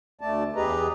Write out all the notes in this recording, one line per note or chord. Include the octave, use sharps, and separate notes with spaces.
D2 A3 D5 A5
E2 G4 G#4 B4 D#5 A#5